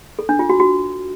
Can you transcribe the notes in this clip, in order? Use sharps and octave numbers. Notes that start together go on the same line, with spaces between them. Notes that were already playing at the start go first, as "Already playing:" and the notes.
A4
D4
F4
F#4
F#4